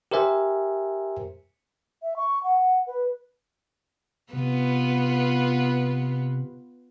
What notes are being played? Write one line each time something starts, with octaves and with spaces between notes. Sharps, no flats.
G4 A#4 C5 E5 G#5
E5
C#6
F#5
B4
C3 B3 F4 B4